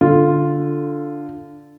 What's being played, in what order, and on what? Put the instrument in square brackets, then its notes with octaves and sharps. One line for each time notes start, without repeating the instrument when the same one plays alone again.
[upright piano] D3 F4